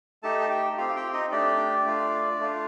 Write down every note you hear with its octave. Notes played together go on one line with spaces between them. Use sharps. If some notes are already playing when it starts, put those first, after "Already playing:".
A3 D#4 G4 A4 A5
A5
G4 G5
C4 F4 G4 F5
F5
G4 G5
D#4 D#5
A3 D4 G4 D5
A3 D4 F4
A3 D4 F4